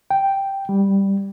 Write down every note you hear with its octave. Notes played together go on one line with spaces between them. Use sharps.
G5
G3